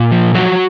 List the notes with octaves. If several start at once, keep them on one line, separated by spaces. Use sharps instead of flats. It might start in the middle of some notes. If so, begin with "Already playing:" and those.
Already playing: A#2
F3
F3 F#3 F#4